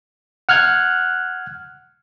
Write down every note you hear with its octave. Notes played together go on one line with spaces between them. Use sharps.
F#5 F6 F#6 G#6